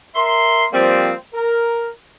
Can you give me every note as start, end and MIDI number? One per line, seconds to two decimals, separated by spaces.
0.15 0.64 70
0.15 0.64 76
0.15 0.64 84
0.73 1.12 53
0.73 1.12 55
0.73 1.12 58
0.73 1.12 60
1.34 1.87 70